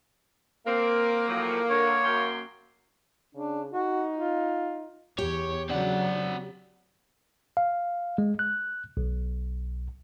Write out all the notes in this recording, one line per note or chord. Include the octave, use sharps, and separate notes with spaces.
A#3 C4 A#4
A2 F3 F#3
D3 C#5
F#2 G5 C6
C#3 D4
D#4 F#4
F4
E2 G4 C#5
C#3 F#3 C4 D4 F#5
F5
G#3
F#6
B1